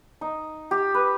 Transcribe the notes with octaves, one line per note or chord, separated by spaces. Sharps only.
D#4
G4
B4